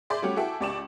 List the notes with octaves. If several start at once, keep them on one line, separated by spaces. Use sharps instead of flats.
G#4 D5 E5 C6 D6 G6
G3 A3 C#4 F#4 G4 F#5
E4 F#4 G#4 A4 E5 G5
C#2 G4 D5 C#6 E7